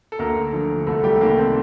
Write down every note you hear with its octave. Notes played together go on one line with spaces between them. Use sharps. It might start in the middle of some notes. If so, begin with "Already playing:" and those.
A4
D2 A#3 A#4
D3 F3
C2 A3 A4
G3 G4
C3 D#3 A#3
C4